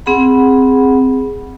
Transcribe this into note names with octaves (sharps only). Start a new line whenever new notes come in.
C4 G#4 F#5 B5